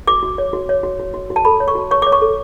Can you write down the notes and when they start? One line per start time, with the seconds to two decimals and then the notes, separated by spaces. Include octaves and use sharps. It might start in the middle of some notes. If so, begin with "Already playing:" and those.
0.07 F#4 D6
0.23 F#4
0.38 C#5
0.53 F#4
0.69 C#5
0.83 F#4
0.99 F#4
1.14 F#4
1.30 F#4
1.36 A5
1.45 A4 B5
1.60 C#5
1.68 C#6
1.75 F#4
1.91 C#5 C#6
2.02 C#5 D6
2.12 C#6
2.22 A4